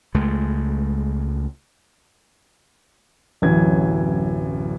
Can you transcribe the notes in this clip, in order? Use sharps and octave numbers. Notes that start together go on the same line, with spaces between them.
C#2 G#3 A3
D1 A1 F#2 E3 G#6